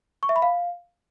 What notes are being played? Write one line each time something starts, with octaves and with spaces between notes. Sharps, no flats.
C#6
E5
B5
F5